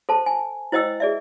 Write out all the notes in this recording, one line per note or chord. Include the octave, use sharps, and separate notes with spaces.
A4 C5 A5
G#5
E4 C5 D#5 G5 E6
G#4 D5 E5